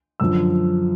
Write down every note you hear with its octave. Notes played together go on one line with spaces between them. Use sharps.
F#2 D3 F3 E6